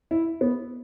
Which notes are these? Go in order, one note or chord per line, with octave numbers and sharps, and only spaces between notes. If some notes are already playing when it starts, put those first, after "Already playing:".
E4
B3